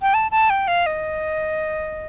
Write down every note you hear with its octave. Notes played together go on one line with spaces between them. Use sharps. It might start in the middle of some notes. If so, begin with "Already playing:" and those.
G5
A5
A5
G5
F5
D#5